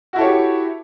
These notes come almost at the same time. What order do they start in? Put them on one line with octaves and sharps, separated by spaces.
F#4 E4 A4 C#5 G4